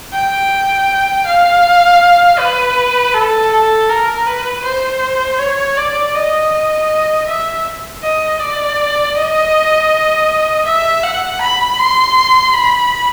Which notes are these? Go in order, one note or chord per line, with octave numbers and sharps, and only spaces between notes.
G5
F5
B4
A4
A4
A#4
B4
C5
C#5
D5
D#5
E5
D#5
D5
D#5
E5
F#5
B5
C6
B5